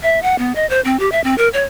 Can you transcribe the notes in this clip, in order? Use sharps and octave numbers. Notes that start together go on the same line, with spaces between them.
E5
F#5
B3
D#5
C5
C4
G4
E5
C4
A#4
C#5